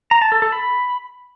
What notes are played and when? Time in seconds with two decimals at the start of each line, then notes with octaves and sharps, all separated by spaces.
0.11 A#5
0.22 A5
0.32 A4
0.42 A4
0.52 B5